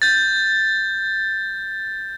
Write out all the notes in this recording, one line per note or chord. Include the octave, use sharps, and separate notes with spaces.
G6 A6